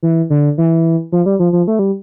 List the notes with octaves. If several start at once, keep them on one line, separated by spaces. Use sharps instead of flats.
E3
D3
E3
F3
G3
F3
F3
A3
G3